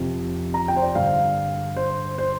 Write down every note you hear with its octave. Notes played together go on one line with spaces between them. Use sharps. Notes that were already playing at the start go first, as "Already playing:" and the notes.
Already playing: F2 C3
A#5
G5
C5
D5
G2 D3 F5
C5
C5